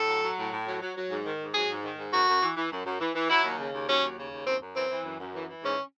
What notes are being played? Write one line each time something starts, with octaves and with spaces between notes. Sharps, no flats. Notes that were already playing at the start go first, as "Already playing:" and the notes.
Already playing: A2 A4
F#3
F#3
A2
A2
F#3
F#3
F#3
G#2
D#3
G#2
F#3 G#4
G#2
D#3
G#2
F#2 F#4
F#2
E3
E3
F#2
F#2
E3
E3
F#3 E4
D#2
C#3
D#2
F#3 C#4
D#2
C#3
D#2
F#2 C4
F#2
E3 C4
E3
F#2
F#2
E3
E3
G#2 C#4